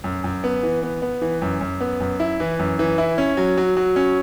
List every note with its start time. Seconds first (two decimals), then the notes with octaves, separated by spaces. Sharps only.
0.04 F#2
0.24 F#2
0.44 B3
0.63 E3
0.83 B3
1.02 B3
1.21 E3
1.42 F#2
1.61 F#2
1.81 B3
2.00 F#2
2.20 E4
2.40 E3
2.59 F#2
2.79 E3
2.98 E4
3.18 C#4
3.37 F#3
3.57 F#3
3.77 F#3
3.96 C#4